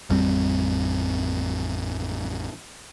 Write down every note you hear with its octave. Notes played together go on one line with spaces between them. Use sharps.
A1 F2 G3 C4